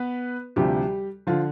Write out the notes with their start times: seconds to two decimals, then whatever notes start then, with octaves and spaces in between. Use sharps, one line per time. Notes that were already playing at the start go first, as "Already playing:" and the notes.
Already playing: B3 B4
0.56 D2 C3 F3 G3 G4
1.27 D3 F3 F4